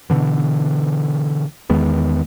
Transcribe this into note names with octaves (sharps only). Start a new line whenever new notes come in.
B2 D3 E3
E2 D#3 G#3 B3